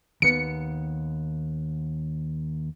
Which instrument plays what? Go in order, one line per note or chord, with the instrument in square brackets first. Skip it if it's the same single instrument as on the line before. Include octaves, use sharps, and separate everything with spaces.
[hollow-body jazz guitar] D#2 B3 [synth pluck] C#7